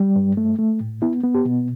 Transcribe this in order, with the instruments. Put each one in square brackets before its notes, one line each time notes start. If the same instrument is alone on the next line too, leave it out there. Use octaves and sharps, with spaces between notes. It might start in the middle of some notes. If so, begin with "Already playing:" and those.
Already playing: [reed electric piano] G3
G2
A3
A3
A2
B3 E4
B3
G4
B2